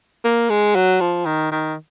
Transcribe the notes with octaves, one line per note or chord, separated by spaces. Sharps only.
A#3
G#3
F#3
F3
D#3
D#3